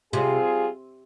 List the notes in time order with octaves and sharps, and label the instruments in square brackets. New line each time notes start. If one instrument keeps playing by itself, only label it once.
[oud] C3 [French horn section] G3 C4 F4 G#4